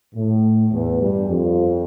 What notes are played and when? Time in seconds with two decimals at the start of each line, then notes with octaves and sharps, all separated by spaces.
0.15 A2
0.73 E2 E3
1.01 G2 G3
1.29 F2 F3